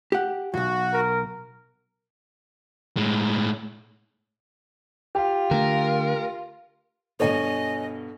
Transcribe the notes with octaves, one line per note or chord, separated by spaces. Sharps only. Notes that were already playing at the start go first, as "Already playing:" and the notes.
G4 F#5
B1 E2 F#4
A#4
A2 G#3
F4 G4
D3 A3 A#4
G2 B2 A4 C#5 D#5 G#5